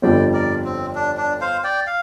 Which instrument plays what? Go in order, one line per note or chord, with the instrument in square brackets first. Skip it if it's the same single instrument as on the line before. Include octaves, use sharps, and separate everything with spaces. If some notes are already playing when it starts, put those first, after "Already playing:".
[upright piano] G1 F2 D3 G3 [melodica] D5 G5
[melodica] A#4 D5
C4
D4
D4
C5 F5
D5 G5
F5